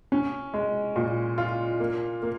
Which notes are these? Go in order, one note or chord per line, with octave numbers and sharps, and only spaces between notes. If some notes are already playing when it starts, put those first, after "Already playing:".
C#4
G#3
A#2
F4
A#3
A#3